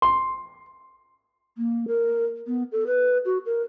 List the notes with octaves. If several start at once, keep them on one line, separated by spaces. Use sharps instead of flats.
C6
A#3
A#4
B3
A4
B4
F#4
A#4